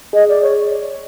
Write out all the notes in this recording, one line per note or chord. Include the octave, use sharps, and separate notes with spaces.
G#4 D#5
D5
C#5